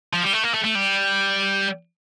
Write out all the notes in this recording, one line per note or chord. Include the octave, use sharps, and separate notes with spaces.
F3
G3
A3
A#3
A3
A3
G3